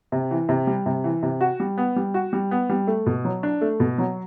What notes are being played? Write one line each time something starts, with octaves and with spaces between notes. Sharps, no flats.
C3
E3
C3
G3
C3
E3
C3
F#4
G3
B3
G3
F#4
G3
B3
G3
A3
B2
F#3
D4
A3
B2
F#3